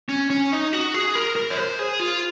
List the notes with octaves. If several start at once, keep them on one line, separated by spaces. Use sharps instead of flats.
C#4
C#4
D#4
F#4
G#4
A#4
A#4
C#5
C5
G#4
F4